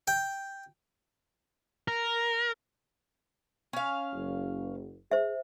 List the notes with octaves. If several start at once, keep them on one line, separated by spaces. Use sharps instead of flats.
G5
A#4
C#4 F5
F#1
G#4 C5 E5